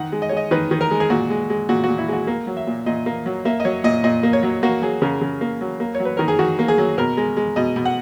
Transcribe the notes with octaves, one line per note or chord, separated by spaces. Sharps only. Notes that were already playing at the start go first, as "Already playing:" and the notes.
Already playing: D#3 F#5
G#3
D#5
C#5
G#3 D#5
D#3 B4
D#3
A#4
G#3
G#4
A#2 F#4
G#3
G#3
A#2 F#4
A#2 F#4
E4
G#3 F#4
A#3
F#3
E5
A#2
A#2 D#5
A#3
F#3
A#3 E5
D#5
F#3 C#5
A#2 D#5
A#2 D#5
A#3
C#5
F#3
A#3 F#4
F#3 G#4
C#3 A#4
C#3
A#3
F#3
A#3
C#5
F#3
B4
D#3 A#4
G#4
D#3 F#4
A#3
G#4
F#3
B2 A#4
G#3
G#3
B2 D#5
B2
F#5